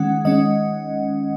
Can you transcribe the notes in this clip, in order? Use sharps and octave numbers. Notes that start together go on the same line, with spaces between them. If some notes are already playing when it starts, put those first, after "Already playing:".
Already playing: D#3 G#3 C#4 F#5
D#3 G#3 C#4 D#5